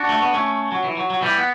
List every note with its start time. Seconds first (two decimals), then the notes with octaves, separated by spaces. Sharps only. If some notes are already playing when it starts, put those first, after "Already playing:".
Already playing: D4 F#4
0.09 A3
0.22 B3
0.34 A3 C#4
0.72 F#3
0.84 E3
0.97 F#3
1.10 F#3
1.22 E3 G3
1.37 B3